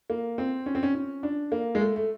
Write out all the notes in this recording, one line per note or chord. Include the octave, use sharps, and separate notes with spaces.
A#3
C4
C#4
C4
C#4
C#4
D4
A#3
G#3
A3
A3